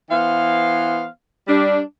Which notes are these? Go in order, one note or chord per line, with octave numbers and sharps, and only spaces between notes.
E3 B3 C5 F5
G3 D4